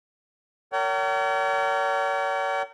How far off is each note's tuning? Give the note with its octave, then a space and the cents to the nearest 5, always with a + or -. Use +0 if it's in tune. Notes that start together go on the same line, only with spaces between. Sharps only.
A#4 -30 C#5 +40 G5 -45